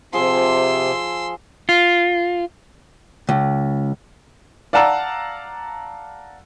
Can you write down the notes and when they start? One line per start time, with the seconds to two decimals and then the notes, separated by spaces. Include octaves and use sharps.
0.13 C3 F3 G#4 C6 E6
1.69 F4
3.29 C#2
4.73 D5 F5 F#5 A5 A#5 E6